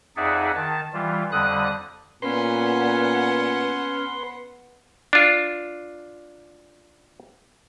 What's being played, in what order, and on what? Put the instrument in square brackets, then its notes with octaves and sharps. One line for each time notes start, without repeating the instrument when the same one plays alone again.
[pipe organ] F2 D#4 G#4 D5 E5 F#5
D#3 A5
E3 G3 F4
F2 D3 G3 D#6 F#6
[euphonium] A#2 [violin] B3 F#5 [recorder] C#4 [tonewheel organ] B4 C6
[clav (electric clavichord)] D4 F4